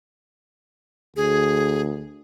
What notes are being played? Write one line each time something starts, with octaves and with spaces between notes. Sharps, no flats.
D2 G#4